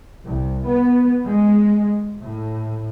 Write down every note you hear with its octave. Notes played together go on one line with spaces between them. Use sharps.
C2
B3
G#3
A2